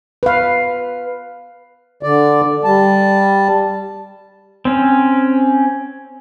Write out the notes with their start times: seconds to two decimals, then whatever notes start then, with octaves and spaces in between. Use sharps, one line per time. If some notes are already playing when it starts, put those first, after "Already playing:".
0.23 B4 F5
2.03 D3 D5
2.64 G3 A5
4.65 C4 C#4